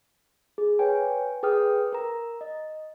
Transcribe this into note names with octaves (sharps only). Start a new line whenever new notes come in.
G#4
B4 C#5 G5 G#5
G#4 B4 G5 D#6 F6
A#4 A#5
D#5